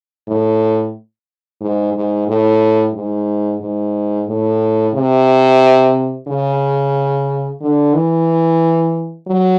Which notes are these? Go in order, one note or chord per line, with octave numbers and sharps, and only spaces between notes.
A2
G#2
G#2
A2
G#2
G#2
A2
C3
C#3
D3
E3
F#3